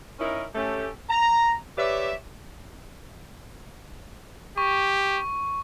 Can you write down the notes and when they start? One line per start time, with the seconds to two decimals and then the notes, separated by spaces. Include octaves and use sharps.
0.19 C#4 D#4 E4 A#4
0.55 A3 C#4 G4
1.09 A#5
1.78 G4 B4 C#5 D5 E5
4.58 G4 C#6